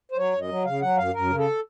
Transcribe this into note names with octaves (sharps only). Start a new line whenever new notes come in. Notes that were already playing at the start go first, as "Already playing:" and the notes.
C5
F#3 C#5
F#2
D#5
F#3
C#3 F5
F#3 F#5
F#2 F5
F#2 A#4
C#3
A4